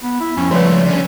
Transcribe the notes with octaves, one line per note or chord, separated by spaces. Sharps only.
B3
E4
F2 C#4
C#2 F3 G3 A3 B4 C#5
D3 C#4